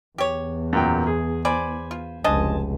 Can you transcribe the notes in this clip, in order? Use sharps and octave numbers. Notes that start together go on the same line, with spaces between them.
E2 G4 C#5
F#2 A#2 G5
G#4
C5 D5 G#5 B5
F4
F1 C#2 D4 C5 D#5 G#5 A5